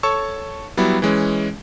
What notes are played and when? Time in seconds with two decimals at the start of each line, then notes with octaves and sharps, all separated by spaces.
0.03 A4 C#5 A5 C#6 E6
0.77 F#3 G3 B3 E4
1.02 E3 G#3 C#4